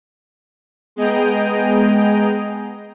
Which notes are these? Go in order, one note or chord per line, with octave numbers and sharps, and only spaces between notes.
G#3 B3 G#4 D#5 G5 A#5